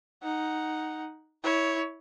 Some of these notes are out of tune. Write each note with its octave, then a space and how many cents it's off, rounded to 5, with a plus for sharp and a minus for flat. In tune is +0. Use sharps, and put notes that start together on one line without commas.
D#4 +0 F#5 +0
E4 -15 C#5 +5